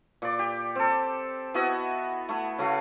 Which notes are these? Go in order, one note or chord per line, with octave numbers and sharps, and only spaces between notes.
A#2 D5
G4
C4 A4
B3 E4 F#4 D#5
A3 E4
C#3 A3 F#4 F5